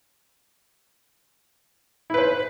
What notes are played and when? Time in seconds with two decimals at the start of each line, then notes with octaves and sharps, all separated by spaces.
2.10 E4
2.14 B4
2.18 C5